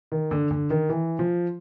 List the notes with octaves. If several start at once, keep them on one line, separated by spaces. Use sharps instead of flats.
D#3
D3
D3
D#3
E3
F3